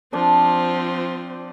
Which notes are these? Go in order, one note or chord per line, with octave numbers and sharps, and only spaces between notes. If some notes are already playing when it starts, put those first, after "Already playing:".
F3 C4 D4